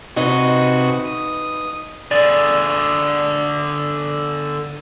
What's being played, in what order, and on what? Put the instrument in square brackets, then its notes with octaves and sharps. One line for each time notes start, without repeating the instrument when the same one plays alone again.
[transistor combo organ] C3 F#4 C#6 [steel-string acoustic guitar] D#4 B4 D#5
[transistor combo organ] D#6
[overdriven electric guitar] D3 G#4 [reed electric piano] D5 A6